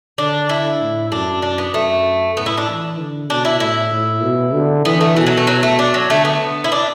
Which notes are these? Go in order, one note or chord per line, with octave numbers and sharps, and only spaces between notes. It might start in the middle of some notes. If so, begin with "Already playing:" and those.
D3 D4
E4
A2
F#2 D4
D4
B3
F#2 A3
A2 B3
E4
D4
E3
D3
B2 D4
E4
A2 E4
A2
B2
D3
E3 B3
A3
B2 E3
F#3
A3
F#3
A3
D4
F#3
D3 A3
B3
E4
D4